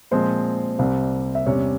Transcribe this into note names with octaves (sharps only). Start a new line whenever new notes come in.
A#2 F3 G#3 C4 C5
C2 C3 G3 C4
E5
E2 C3 G3 C#4 C#5